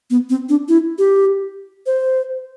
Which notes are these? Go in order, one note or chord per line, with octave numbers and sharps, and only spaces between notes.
B3
C4
D4
E4
G4
C5